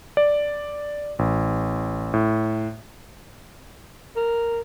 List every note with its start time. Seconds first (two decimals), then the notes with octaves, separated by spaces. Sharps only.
0.17 D5
1.19 A1
2.14 A2
4.16 A#4